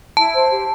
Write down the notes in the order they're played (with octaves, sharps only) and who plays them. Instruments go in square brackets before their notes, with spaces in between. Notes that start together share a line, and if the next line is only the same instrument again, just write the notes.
[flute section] E4 [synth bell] A5
[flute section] C5
G4